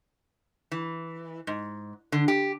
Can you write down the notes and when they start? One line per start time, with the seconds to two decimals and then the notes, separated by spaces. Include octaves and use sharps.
0.72 E3
1.47 G#2
2.12 D3
2.28 G4